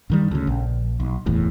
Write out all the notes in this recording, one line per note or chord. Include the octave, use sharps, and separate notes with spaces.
G2 D#3 G3
D2 C#3
A#1
B1
F#1 E2 A2